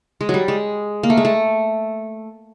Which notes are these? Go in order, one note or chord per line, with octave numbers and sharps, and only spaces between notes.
G#3
F#3
G3
G#3
A#3
A3
G#3
A3